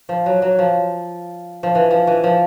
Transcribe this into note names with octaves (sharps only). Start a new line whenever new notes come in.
F3
F#3
F#3
F3
F3
E3
F3
E3
F3